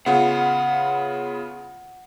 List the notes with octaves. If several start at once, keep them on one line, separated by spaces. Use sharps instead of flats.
C#3 B3 F4 F#5